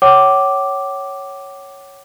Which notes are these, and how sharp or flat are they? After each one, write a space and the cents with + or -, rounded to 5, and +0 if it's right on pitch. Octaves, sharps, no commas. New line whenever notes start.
C#5 +0 F#5 +45 D6 +0